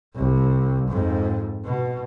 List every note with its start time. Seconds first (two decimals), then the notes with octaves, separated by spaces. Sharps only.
0.16 C2
0.88 F2 G#2
1.64 B2